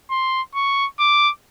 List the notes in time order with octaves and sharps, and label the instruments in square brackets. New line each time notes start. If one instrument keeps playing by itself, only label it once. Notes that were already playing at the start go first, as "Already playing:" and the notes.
[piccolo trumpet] C6
C#6
D6